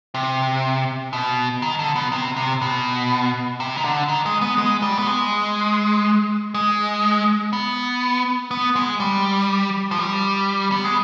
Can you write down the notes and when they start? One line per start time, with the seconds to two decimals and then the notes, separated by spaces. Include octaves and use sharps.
0.14 C3
1.13 B2
1.62 D#3
1.79 D3
1.96 B2
2.12 C3
2.37 C3
2.62 B2
3.60 C3
3.77 D#3
3.84 D3
4.08 D#3
4.26 G#3
4.41 B3
4.58 G#3
4.83 G3
4.98 B3
5.07 G#3
6.54 G#3
7.53 B3
8.51 B3
8.76 G#3
9.00 G3
9.91 F3
9.99 G3
10.72 B3
10.84 G#3